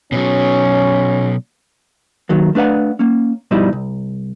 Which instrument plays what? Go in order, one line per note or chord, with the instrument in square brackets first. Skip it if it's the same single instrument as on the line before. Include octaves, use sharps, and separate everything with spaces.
[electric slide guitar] B2 F#3 [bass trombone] C#4
[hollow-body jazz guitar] D#2 D#3 F#3 A#3
A3 D4 B4 F5 F#5
A#3 C#4
G2 B2 F3 G3 D#4 E4
C2